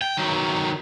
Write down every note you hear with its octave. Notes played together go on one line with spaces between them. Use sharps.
G5
D#3 F#3